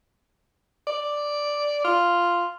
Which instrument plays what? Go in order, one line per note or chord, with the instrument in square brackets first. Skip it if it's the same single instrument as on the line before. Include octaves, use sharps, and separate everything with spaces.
[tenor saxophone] D5
F4